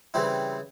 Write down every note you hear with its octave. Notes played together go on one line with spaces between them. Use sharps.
C#3 E3 G3 C4 E4